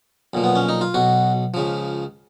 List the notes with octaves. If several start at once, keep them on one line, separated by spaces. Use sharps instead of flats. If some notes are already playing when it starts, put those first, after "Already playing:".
B1 A#2 F3
B3
C#4
D#4
F4
B1 B2 F#4
C#2 C#3 F3